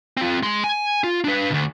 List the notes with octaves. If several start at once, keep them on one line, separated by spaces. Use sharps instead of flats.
C4 F4
G#3 C6
G#5
F4
D4 B4
D2 B2